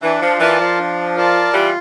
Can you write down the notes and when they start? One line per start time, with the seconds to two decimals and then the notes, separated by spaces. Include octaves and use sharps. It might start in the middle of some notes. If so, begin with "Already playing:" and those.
0.03 E3 D4
0.22 F3
0.40 E3 F4 A#4 D5 A5
0.60 F3
0.78 D4
1.16 F4 A#4 D5 A5
1.53 E3 G3 F4